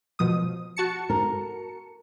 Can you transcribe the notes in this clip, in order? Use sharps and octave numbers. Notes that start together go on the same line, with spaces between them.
B2 F3 D#6
F#4 A5 C#7
A#4